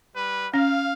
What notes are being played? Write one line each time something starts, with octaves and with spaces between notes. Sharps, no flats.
G3 B4
C#4 F5